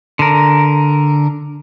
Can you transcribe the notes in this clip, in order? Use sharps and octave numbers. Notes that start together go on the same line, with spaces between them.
D3 A#4